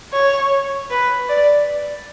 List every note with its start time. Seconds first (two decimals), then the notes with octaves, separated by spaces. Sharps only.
0.13 C#5
0.91 B4
1.29 D5